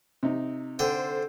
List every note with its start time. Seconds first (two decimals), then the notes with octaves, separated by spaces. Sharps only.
0.23 C3 D#4
0.79 D3 A4 C5 G5